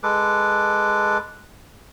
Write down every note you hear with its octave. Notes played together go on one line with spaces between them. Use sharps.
G#3 A4 B4 D6